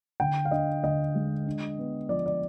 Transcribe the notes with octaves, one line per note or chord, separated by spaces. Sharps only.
D3 G5
F5
D4 D#5
D3 D#5
G#3
D4
B3
F3 D5
D5